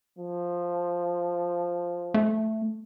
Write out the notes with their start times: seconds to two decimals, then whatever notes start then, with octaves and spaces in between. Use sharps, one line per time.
0.19 F3
2.14 A3